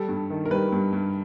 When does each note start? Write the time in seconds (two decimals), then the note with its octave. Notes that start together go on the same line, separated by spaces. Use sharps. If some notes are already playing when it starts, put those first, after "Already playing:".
Already playing: G3 A4
0.09 G2
0.30 D#3
0.45 A#4
0.51 G3 B4
0.72 G2
0.93 G2